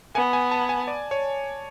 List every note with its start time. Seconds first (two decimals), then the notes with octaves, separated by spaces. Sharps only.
0.15 B3 G#5
0.33 G#5
0.52 A5
0.69 G#5
0.88 D5
1.11 C#5